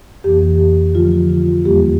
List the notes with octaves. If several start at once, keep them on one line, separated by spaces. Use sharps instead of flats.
F2 E3 A#3 G4
D3 F3 A3 F4
F4
E2 E3 G3 A#3 G4